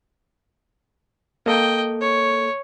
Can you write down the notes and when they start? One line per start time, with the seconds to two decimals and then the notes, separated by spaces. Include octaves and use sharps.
1.46 A#3 A4 D#5 G5
2.01 C#5